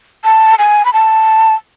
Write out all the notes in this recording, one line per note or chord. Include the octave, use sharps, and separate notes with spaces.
A5
G#5
B5
A5